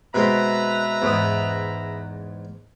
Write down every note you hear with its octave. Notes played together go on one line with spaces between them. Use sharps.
B2 G#3 C4 B4 E5 A#5
E2 G#2 D#6